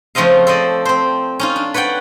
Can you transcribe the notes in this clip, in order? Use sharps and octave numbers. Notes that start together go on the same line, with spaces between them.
C#3 F3 A3 C4 D#5 F5
A4 C5 D5 D#5
C4 C5
C#4 D#4 F4
D4
B4 C#5 D5 F#5 G5